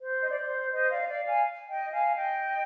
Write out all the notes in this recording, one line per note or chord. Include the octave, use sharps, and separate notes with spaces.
C5
D#5
D5
C5
C5 D#5
D5 F5
D#5
D5 F5
F5 G#5
D#5 G5
F5 G#5
D#5 G5